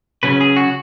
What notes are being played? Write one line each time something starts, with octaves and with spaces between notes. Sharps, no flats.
C#3 F#3 C#4 B4
G#4
F#4